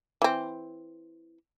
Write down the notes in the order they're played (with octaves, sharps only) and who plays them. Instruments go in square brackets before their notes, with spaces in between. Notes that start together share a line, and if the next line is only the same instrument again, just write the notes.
[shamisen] E3 C4